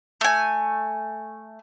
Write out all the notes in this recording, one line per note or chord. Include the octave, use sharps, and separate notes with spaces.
A3 G#5